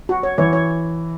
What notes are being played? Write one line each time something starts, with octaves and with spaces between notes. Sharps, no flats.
F#4
C#5
E3 C#5
C#5